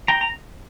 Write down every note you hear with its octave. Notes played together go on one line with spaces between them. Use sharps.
G5 A#5
A#5